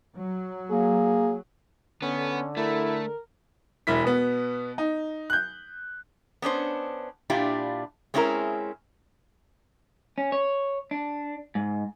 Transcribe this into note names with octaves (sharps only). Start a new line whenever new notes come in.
F#3
A#3 G#4
D3 B3 C#4
A3 E4 A#4
E1 E4 B6
B2 B3
D#4
F#6 G6
B3 C#4 D4 C5
A#2 D4 E4 F4 G4
G#3 C4 C#4 E4 G#4 A#4
C#4
C#5
D4
G#2